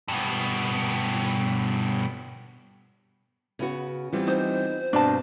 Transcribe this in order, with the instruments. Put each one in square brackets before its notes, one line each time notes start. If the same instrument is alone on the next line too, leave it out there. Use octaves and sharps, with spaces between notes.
[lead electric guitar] G2 B2
[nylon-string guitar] C#3 B3 F#4
[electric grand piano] E3 G3 C4 [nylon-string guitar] B3 F4
[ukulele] D#4 [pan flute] C5
[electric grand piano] G2 B2 C4 [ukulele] D4 A5